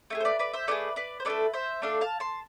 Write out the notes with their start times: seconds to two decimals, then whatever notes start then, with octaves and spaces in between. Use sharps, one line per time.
0.10 A3 E4 G#4
0.20 C5
0.25 B4 D5
0.39 B4 D5
0.53 C5 E5
0.68 A3 E4 G#4 B4 D5
0.96 B4 D5
1.20 C5
1.25 A3 D4 A4 B4 D5
1.54 C5 E5
1.82 A3 D4 A4 D5 F5
2.01 F5 A5
2.20 A5 C6